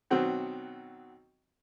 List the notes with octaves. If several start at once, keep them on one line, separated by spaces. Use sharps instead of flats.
B2 D#3 F#3 C4 F#4